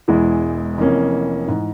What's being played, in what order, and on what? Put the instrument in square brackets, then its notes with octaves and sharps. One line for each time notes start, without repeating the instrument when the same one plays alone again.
[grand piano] E1 E2 E3 G#3 E4
F1 F2 E3 A#3 C#4
G#2 E3